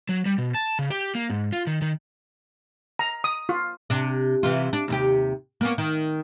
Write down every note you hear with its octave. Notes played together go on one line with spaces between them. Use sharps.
F#3
G3
B2
A5
C#3
G4
A#3
G#2
F4
D#3
D#3
A#5
D#6
F4
C3 D4
C3 E3 F4
D4
D#2 C3 G4
A#3 B3 C#4
D#3